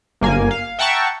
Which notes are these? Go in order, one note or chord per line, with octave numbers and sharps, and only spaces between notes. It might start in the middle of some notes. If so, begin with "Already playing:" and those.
G1 A#3 G#5
F5
E5 F#5 G5 A5 A#5 C#6